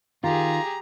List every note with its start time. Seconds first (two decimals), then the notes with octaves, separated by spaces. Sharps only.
0.24 D#3 F4 G4 G#4 A#5